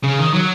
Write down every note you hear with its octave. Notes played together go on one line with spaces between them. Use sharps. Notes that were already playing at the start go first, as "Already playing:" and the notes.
C#3
D#3
F#3